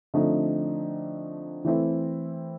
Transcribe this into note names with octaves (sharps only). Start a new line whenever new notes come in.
D3 F3 A3 C4 D#4
E3 A3 C4 E4